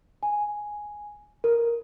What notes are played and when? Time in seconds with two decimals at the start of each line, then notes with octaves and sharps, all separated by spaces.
0.23 G#5
1.44 A#4